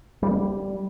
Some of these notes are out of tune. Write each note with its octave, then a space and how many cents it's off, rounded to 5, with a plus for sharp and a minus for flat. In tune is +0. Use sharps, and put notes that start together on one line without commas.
G3 -5